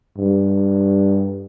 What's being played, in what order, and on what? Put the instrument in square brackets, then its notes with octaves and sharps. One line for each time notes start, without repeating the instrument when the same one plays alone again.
[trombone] G2